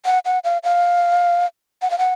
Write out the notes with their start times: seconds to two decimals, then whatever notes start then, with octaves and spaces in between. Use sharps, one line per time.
0.05 F#5
0.25 F#5
0.44 F5
0.64 F5
1.82 F#5
1.90 F5
1.98 F#5